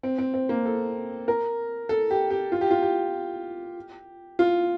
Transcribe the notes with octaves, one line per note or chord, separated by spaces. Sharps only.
C4
C4
C4
A#3
A4
A#4
A4
G4
G4
F4
G4
F4
G4
F4